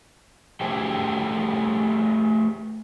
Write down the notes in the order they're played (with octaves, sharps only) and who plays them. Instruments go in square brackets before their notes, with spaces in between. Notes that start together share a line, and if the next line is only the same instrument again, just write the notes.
[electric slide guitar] A3 G4 G#4 C5 G5